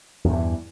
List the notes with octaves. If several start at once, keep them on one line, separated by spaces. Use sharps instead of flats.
E2 G2 E3